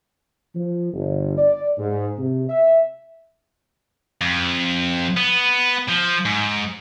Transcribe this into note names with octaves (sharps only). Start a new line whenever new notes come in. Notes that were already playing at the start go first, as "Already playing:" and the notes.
F3
G1
D5
G#2
C3
E5
F2
B3
F3
G#2